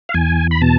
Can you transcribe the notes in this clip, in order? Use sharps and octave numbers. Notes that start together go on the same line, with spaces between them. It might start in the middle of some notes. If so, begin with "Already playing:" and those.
F5
E2 G#5
B5
B2 A5